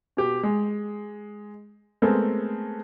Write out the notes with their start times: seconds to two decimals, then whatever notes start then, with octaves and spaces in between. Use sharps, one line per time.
0.17 B2 G4
0.43 G#3
2.02 G#3 A3 B3 C4 A4 A#4